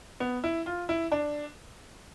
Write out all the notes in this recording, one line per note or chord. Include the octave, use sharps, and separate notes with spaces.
B3
E4
F4
E4
D4